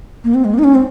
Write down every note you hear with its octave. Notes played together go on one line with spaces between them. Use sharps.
A#3
C4
G#3
A#3
D#4
C#4
C4